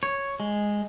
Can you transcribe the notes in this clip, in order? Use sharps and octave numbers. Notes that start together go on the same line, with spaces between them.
C#5
G#3